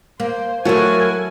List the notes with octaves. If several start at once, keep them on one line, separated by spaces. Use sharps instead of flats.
A#3 C5
F#3 A3 E4 F#4 A4 A#4 C#5 G#5